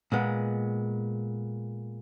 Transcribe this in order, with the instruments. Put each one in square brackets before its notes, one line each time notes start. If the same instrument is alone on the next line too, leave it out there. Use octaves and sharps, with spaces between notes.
[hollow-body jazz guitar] A#2 G#3 B3